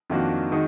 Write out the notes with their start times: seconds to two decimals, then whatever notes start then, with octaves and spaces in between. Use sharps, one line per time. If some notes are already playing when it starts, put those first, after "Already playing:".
0.10 F2 D#3 A#3 D4 F#4
0.52 D#3 G#3 D#4 F#4